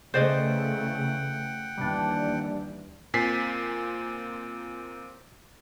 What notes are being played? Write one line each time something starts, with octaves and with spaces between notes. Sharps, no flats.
C#3 E3 A3 C5 D5 D#5 F#5 G5
D#2 E3 G3 D4
A#2 C4 G#5 B6 C7